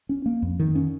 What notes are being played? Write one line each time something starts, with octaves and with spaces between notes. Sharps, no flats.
C#4
A#3
F2
D#3
C#4